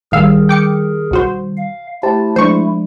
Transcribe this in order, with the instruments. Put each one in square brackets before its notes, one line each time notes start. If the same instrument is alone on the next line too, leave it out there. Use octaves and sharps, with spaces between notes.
[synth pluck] A1 F5 E6 [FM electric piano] D#3 G3 [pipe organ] G#4 A#4
[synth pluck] G5 D6 C#7
B1 F#4 C5
[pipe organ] F5
[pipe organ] A3 E4 [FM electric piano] G4 C5 A5
[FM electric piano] F3 G#3 D4 [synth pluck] C5 C#6